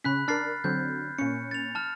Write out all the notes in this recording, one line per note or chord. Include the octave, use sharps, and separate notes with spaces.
C#3 C#4 B5 F#6 B6
D4 A#4 F6 A6 C7
D3 F#3 C4 G6
A#2 C#4 C#7
A6 F7
A5 F6